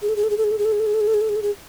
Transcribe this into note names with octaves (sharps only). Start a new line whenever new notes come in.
G#4
A4
G#4
A4
G#4
A4
G#4
A4
G#4
A4
G#4
A4
G#4
A4
G#4
A4
G#4
A4
G#4
A4
G#4